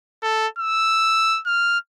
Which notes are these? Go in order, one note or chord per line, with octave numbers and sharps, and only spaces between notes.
A4
E6
F6